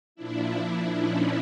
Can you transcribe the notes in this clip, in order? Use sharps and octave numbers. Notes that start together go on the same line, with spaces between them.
A#2 F3 D4 E4
C#4 D#4